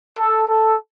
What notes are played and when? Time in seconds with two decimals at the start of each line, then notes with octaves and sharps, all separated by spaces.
0.19 A4
0.48 A4